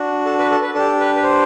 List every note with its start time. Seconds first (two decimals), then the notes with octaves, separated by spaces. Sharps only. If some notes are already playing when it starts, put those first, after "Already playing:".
Already playing: D4 F#4
0.25 A4
0.39 B4
0.51 A4
0.62 B4
0.74 D4 G4 A4
1.00 B4
1.16 B4
1.23 C5